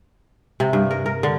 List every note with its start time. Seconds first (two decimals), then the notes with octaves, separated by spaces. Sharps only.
0.60 C3
0.73 G2
0.91 A#4
1.06 A#4
1.23 D3